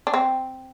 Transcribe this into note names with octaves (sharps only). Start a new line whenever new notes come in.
D4
C4